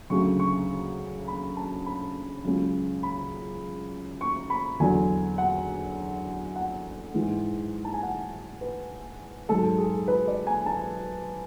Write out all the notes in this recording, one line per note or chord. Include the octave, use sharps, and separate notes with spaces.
D2 C#3 F#3 C#6
C#6
B5
A5
B5
C#2 C#3 F#3
B5
C#6
B5
E2 D3 F#3 G#5
F#5
F#5
G#2 E3
A5
G#5
F#5
B4
G#2 F#3 A4
G#4
B4
D5
G#5
A5